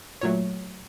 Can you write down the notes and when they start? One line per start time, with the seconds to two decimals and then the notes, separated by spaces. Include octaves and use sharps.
0.21 A#2 F#3 A3 C#5